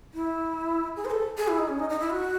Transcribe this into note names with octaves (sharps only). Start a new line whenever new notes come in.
E4
G#4
C5
A4
G#4
E4
D#4
C#4
D#4
D#4
E4
F#4